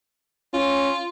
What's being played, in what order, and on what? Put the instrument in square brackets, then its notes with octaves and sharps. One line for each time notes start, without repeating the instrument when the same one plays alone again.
[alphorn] C#4 [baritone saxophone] F4